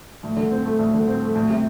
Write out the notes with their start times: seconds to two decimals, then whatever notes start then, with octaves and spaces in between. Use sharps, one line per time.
0.23 D2
0.36 D3
0.51 C4
0.65 A3
0.79 D2
0.94 D3
1.07 C4
1.22 A3
1.35 D2
1.50 C3